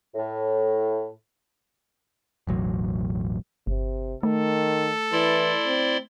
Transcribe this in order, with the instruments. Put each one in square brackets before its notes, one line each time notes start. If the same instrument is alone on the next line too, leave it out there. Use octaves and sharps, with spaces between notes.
[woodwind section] A2
[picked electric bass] E1 A1 F#3
[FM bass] G1 [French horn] C3
[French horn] D#3 [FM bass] A3 [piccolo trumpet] A4
[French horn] E3 [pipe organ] E4 D5 C6
[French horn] C4